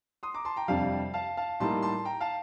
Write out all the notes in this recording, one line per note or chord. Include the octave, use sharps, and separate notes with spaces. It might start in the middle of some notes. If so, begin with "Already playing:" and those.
C6 D#6
A#5 D6
A5 C6
G5 A#5
F2 C3 G3 D4 F5 A5
F5 A5
F5 A5
A2 G3 A#3 D#4 A5 C6
A5 C6
G5 A#5
F5 A5